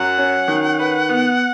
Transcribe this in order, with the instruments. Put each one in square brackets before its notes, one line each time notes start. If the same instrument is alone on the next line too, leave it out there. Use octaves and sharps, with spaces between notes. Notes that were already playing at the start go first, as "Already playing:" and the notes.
Already playing: [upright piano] F#2 F#3 [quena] F#5
[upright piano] C#4
D#3
B4
B3